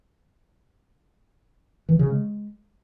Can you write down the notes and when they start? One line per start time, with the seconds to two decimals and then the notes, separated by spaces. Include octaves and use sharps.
1.89 E3
1.99 C#3
2.10 G#3